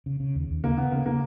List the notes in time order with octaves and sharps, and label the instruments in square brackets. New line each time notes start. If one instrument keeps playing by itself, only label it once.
[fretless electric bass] C#3
C#3
D#2
D#2
[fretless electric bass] C#3 [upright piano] A#3
[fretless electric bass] C#3 [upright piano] B3
[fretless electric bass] C#3 [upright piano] A#3
[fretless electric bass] C#3 [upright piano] A#3